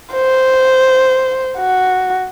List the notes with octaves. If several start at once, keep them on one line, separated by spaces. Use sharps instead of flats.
C5
F#4